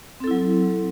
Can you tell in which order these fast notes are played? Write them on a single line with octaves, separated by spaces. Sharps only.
C4 A4 E4 F#3